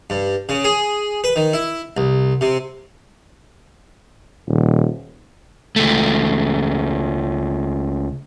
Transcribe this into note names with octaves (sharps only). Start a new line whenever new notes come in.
G2
C#3
G#4
B4
D#3
E4
C2
C3
D#1
C#2 A3